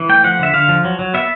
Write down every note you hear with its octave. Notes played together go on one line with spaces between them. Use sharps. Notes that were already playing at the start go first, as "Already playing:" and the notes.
Already playing: E3
A3 G5
F3 F#5
D3 E5
D3 F5
F3
F#3
F#3
B3 E5